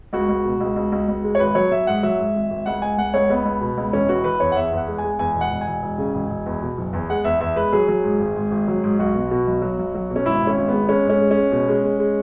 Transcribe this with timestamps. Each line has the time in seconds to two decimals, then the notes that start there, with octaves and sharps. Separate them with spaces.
0.13 C#2 F#4
0.29 C#2
0.45 B2
0.60 C#2
0.76 C#2
0.92 C#2
1.08 C#2
1.24 G#3
1.35 C#5
1.39 G#1 B4
1.55 F#3 C#5
1.71 F#3 E5
1.87 G#2 F#5
2.03 F#3 E5
2.19 G#2
2.35 G#1
2.50 G#1
2.66 C#2 F#5
2.82 C#2 G#5
2.98 C#2 F#5
3.14 C#2 C#5
3.30 C#2 B3
3.45 C#2
3.61 B2
3.77 C#2
3.93 E1 C#4
4.08 E3 F#4
4.24 E3 B4
4.40 E2 C#5
4.52 F#5
4.56 E2 E5
4.72 E2 F#5
4.88 G#3
4.98 G#5
5.04 G#3
5.19 E2 G#5
5.35 E1
5.41 F#5
5.51 E1
5.61 G#5
5.66 E1
5.82 E1
5.98 C#3
6.14 E1
6.30 E1
6.46 E2
6.62 B2
6.77 F#1
6.93 E2
7.09 G#3 F#5
7.24 E2 E5
7.41 E2 E5
7.56 G#3 B4
7.73 F#3 G#4
7.88 F#3
8.04 G#2
8.20 G#1
8.36 G#2
8.51 G#1
8.68 F#3
8.84 G#2
8.99 B1 F#4
9.15 B2
9.31 B2
9.47 B1
9.62 F#3
9.79 B1
9.94 F#3
10.10 B2
10.16 C#4
10.25 G#1 E4
10.42 G#1
10.47 C#4
10.57 G#1
10.68 B3
10.73 G#3
10.89 G#3 C#4
11.05 G#2 C#4
11.21 G#3
11.31 C#4
11.36 G#3
11.52 B2
11.68 G#3
11.84 G#3
11.99 G#3